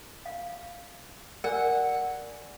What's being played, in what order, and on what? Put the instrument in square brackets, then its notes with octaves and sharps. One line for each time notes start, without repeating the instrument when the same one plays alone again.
[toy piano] F5
[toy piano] A#4 D5 G#5 [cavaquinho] F#5